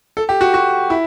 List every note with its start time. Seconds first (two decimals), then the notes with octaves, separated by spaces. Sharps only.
0.17 A4
0.29 G4
0.41 F#4
0.54 F#4
0.90 E4